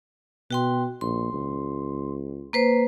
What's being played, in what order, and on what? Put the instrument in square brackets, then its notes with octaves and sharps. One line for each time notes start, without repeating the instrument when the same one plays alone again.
[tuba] B2 [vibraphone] F#4 G5 C6
[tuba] A#1 [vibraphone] C6
[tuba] C#2
[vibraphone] A#3 B4 C5